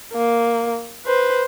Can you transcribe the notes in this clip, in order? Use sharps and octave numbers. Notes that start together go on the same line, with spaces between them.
A#3
B4 C5